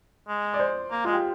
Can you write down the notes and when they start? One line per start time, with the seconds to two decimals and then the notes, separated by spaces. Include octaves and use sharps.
0.28 G#3
0.54 D5
0.59 C5
0.91 A#3
1.05 G#3 F4
1.13 G4